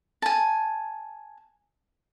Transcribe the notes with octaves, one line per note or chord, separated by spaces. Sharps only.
G#5 A5